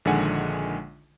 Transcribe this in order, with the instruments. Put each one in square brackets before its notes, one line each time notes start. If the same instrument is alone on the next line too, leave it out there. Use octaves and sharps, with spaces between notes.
[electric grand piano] A#1 D3 D#3 G#3 F#5 G#5